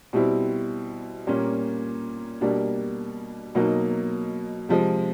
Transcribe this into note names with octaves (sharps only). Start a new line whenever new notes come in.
B2 G3 C4 E4
A#2 G3 A#3 C#4
B2 G3 A#3 D4
B2 F#3 A#3 D#4
C3 F3 G#3